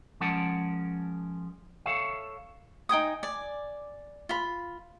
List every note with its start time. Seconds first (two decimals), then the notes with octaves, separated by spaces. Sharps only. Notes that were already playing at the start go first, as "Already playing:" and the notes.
0.21 F3 G#3 C#4 A#4 F#5 A5
1.86 A4 C#5 E5 F5
2.89 D#4 G5 G#5 D#6
3.23 D5 G#5
4.29 F4 B5